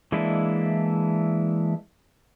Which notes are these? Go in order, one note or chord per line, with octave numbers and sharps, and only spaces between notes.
E3 G#3 A#3 D4 E4